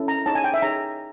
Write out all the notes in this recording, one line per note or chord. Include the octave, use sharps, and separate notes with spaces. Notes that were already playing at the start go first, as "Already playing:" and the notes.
Already playing: C#4 E4 A4
A#5
D#4 G#4 C#5 A5
G#5
G5
E5
D#4 G#4 C#5 A#5